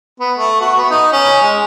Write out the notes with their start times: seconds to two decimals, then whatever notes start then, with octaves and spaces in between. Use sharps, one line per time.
0.20 B3
0.38 A3
0.60 F#4
0.77 B3
0.90 D#4
1.12 C#4
1.42 G#3